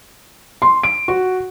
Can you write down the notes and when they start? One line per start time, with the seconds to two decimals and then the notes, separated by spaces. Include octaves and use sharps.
0.62 C6
0.83 D7
1.08 F#4